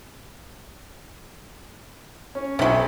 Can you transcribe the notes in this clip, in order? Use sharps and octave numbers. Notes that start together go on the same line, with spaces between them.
C#4
B1 C3 F#3